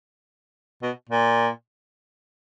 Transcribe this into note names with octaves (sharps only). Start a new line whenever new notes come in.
B2
A#2